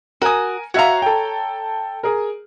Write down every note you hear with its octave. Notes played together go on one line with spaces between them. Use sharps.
F#4 A#4 G#5 D#6
F#4 C#5 E5 F5 A#5
A4 G5
G#4 A#4